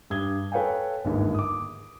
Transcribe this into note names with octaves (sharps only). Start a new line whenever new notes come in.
G2 D#6 G#6 G7
A4 B4 C#5 F5 G5 G#5
G1 D#2 G#2
D6 D#6